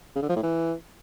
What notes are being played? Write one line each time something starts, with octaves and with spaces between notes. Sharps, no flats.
C#3
D3
F3
A2
E3